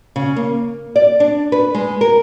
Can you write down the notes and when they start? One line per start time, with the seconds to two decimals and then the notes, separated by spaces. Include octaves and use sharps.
0.16 C#3
0.36 A#3
0.96 D5
1.20 D4
1.52 B4
1.75 G#3
2.01 A#4